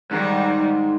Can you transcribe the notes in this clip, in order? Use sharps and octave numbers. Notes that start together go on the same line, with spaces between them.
G#2 D#3 G3